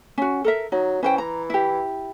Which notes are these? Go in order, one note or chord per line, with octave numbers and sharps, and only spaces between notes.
C#4 F#4
A4 A#4 E5
F#3 D#4
E3 C#4 C5 G5
A#5
E4 G4